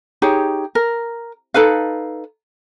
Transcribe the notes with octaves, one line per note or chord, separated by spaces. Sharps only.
D#4 G4 G#4 C#5
A#4
D#4 A4 B4 F5